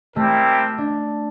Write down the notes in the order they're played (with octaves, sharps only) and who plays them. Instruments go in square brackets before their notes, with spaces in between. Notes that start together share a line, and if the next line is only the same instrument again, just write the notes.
[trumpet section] G3 C4 E4 G4 A#4 [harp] A3
[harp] D4